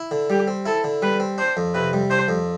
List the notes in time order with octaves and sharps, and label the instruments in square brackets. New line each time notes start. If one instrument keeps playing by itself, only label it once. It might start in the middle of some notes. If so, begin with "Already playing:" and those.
Already playing: [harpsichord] E4
D3
[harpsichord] G3 [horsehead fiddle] G4
[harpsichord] C4
[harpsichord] E4 [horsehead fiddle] A4
[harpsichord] D3
[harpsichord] G3 [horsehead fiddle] B4
[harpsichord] C4
[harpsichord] D4 [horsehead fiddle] C5
[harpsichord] F2
[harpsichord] C3 [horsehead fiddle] B4
[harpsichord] G3
[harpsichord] D4 [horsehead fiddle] C5
[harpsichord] F2